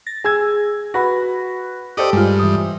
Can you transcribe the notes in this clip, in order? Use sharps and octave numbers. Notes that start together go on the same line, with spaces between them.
A6 A#6
G#4 G#5 E6 G#6
F#4 B4 B5 A#6
G4 A4 C5 D5 D#5
G2 G#3 F4
E3 D#6